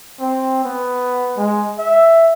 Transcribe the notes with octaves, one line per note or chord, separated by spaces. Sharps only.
C4
B3
G#3
E5